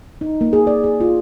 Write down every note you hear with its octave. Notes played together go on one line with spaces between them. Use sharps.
D#4
A#3
G#4
D5
G#4
F4